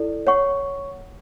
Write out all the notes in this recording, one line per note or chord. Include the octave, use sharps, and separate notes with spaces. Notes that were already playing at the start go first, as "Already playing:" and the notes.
Already playing: E4 A4 D5
C#5 F#5 C#6